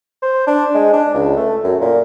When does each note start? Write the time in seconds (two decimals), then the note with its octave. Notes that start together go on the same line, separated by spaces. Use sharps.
0.22 C5
0.47 D4
0.75 G#3
0.93 D4
1.14 C#2
1.36 A3
1.64 F#2
1.81 A#2